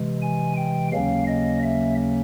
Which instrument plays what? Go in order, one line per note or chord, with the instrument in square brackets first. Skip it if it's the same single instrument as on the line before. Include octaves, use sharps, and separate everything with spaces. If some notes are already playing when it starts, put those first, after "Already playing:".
Already playing: [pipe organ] C3 E3 G#3
G#5
G5
D#2 C#3 F#3 A#3 C#4 F5
D#5
E5